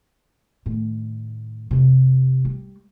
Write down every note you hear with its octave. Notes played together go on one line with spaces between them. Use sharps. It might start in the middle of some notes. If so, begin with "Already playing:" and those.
A2 D#3
F2 C3
G3